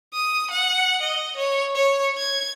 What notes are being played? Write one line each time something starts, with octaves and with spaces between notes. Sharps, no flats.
D#6
F#5
D#5
C#5
C#5
G#6